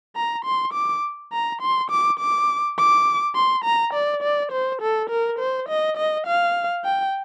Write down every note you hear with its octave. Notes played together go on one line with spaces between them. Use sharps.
A#5
C6
D6
A#5
C6
D6
D6
D6
C6
A#5
D5
D5
C5
A4
A#4
C5
D#5
D#5
F5
G5